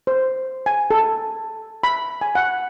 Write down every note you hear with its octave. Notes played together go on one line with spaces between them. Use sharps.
C5
G#5
A4
B5
G#5
F#5